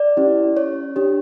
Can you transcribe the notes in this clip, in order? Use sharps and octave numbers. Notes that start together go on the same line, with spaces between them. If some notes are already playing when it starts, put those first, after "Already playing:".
Already playing: D5
C#4 E4 G4
C#5
D4 G4